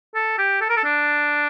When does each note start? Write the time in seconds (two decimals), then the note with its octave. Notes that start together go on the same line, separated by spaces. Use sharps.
0.15 A4
0.38 G4
0.61 A4
0.69 A#4
0.77 A4
0.85 D4